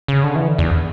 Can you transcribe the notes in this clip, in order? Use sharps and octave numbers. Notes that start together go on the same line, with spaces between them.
C#3
D3
E3
D3
E2